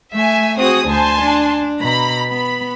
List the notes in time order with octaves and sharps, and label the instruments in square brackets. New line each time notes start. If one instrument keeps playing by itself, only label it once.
[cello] A3 [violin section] E5 G#5
[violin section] C4 D#6 [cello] F#4 G#4
[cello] D2 C5 [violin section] G#5 A5 C6
[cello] D4
[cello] B2 [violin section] A#5 B5
[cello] B3 [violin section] B5